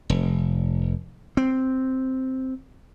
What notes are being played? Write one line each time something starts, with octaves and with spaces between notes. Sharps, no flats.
F1
C4